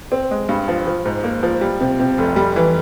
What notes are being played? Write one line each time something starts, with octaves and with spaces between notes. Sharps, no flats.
C4
G#3
G2
F3
F3
G#2
A#3
F3
G3
C3
C3
F1
G3
E3